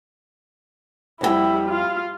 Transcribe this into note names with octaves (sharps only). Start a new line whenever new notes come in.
F2 G3 E4 F#4 G5
F4 F5